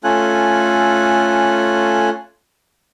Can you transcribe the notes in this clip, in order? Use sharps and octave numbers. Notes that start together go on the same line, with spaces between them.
A3 C#4 F4 A4 G#5 F#6